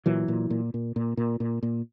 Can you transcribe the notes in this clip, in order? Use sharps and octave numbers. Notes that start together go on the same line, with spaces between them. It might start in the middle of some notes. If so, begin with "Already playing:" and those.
A#2 E3 F#3
A#2
A#2
A#2
A#2
A#2
A#2
A#2